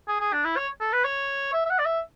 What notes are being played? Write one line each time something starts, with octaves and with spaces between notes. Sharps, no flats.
G#4
G#4
D4
E4
C#5
A4
B4
C#5
E5
E5
F#5
D5
E5